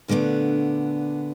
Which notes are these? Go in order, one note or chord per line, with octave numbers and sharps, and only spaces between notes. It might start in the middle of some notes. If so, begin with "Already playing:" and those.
A#2 D3 A3 B3 D4